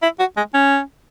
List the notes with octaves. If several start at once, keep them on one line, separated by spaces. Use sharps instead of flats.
E4
F#4
G#3
C#4